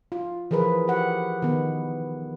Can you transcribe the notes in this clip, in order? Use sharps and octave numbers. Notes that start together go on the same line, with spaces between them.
F4
E3 F3 G#4 A#4 B4
G4 F#5
D#3 B3